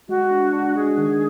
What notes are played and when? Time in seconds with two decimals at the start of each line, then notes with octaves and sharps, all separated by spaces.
0.09 G#3 F#4
0.31 D4
0.53 D4
0.76 G#3 G#4
0.98 D#3